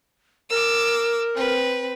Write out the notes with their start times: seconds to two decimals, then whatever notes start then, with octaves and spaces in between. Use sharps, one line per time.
0.50 A#4 D6 E6
1.36 C4 B4